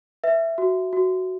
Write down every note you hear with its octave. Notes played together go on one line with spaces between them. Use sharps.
B4 E5
F#4
F#4